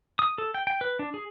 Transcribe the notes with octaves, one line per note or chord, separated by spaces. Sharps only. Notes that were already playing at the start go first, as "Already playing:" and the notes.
D#6
A4
G5
G5
B4
D4
G#4